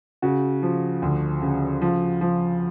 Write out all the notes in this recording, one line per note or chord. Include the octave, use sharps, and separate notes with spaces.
C#3 F#4
F3
D2
C#3
F3
F3